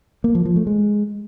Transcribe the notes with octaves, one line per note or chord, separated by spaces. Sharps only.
A#3
F3
F3
A3
G#3